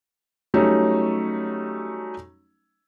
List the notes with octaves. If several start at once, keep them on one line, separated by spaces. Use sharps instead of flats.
F#3 G3 A3 C#4 D#4